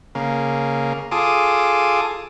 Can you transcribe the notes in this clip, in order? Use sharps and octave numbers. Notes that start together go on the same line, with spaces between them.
C#3 A#3
F4 G#4 A4 D6 D#6